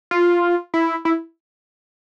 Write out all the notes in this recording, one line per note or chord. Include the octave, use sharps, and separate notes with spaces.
F4
E4
E4